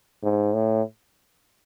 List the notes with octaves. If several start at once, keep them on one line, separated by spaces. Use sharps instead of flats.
G#2
A2